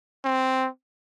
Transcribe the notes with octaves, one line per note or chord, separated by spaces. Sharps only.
C4